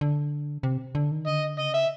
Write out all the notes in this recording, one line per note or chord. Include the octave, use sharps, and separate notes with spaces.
D3
C3
D3
D#3
D3 D#5
C#3 D#5
E5